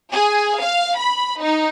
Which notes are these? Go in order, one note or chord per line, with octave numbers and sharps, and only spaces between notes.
G#4
F5
B5
D#4